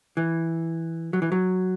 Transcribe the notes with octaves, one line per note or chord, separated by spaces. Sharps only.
E3
F#3
E3
F#3